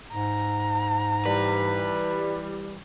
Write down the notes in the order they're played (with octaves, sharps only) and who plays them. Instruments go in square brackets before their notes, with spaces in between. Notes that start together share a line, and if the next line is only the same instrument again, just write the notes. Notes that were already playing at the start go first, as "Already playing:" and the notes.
[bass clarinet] G#2 [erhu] A#5
[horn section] E3 G3 [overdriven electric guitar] B4